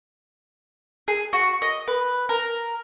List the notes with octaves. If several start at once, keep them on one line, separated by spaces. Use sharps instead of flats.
G#4
F#4
D#5
B4
A#4